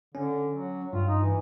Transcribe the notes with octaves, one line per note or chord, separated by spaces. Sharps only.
D3 C#4
F#3
G2 F4
D#4
E3